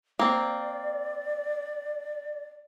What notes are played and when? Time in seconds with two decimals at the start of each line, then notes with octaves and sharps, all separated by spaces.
0.19 A#3 C4 D5